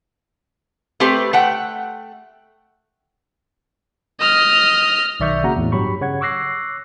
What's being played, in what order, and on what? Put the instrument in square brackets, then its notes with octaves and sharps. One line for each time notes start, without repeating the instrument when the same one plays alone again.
[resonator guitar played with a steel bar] A3 C4 G4 B4
A3 F#5 G5
[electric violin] D#5 F6
[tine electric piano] B1 D#3 D5 E5 C#6 G6
C#3 A#3 F#4 F#5 A#5
E2 A2
G2 F#3 G4 B5 C#6
C#3 C#5 F#5 G#6
C#6 D6 E6 F#6 A#6 C7